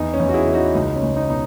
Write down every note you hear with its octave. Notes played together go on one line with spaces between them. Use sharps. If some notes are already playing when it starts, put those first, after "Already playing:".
Already playing: E2 D#4
C#4
E2
F#4
E4 G#4
E3
D#4 F#4
C#2 D#4
C#4
C#2
D#4
B2 D#4